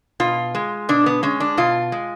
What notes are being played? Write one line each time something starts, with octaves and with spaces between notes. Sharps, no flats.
B2 F4
G#3
B2 D4
B3
G#3 C#4
D4
B2 F4
G#3